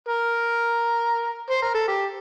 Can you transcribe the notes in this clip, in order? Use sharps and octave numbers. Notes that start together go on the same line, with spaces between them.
A#4
C5
A#4
A4
G4